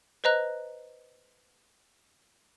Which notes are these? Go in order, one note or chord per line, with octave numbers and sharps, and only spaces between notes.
B4 C5 D#5 A#5 F#6